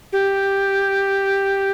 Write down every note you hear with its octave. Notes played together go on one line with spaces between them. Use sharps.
G4